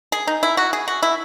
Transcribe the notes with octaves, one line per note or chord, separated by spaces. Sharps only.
G#4
D#4
E4
F#4
G#4
F#4
E4